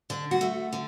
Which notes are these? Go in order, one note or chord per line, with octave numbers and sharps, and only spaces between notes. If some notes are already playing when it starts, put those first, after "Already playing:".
D3 D4
F#4
A3
D3